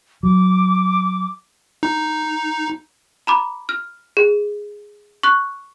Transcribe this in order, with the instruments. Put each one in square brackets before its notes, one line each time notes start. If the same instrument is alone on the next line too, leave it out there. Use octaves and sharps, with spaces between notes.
[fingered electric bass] F#3 [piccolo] D6
[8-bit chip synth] D#4
[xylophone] A#5 B5 D6
F6
G#4
C#6 F#6